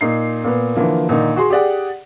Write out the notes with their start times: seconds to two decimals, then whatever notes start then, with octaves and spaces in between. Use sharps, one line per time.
0.01 A#2 D#4 C7
0.44 A#2 B3
0.75 D3 E3 F3 A#3
1.09 A#2 D3 D#3 D#4
1.36 F#4 G#4 C6
1.50 G4 G#4 D5 F#5